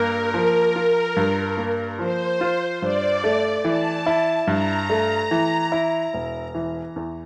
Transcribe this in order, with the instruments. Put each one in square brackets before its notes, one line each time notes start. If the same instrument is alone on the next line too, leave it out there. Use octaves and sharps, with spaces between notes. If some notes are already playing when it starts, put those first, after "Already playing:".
Already playing: [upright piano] G2 A#3 [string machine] A#4
[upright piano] F3
F4
G2
A#3
[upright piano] F3 [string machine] C5
[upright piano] F4
[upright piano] G2 [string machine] D5
[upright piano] A3
[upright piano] E3 [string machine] A5
[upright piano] E4
[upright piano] G2 [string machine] A#5
[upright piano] A3
E3
E4
E1
E3
E2